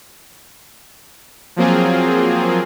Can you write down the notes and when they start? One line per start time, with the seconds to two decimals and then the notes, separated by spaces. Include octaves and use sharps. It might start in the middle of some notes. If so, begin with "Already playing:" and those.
1.56 F3 F#3 A#3 C4 F4 G#4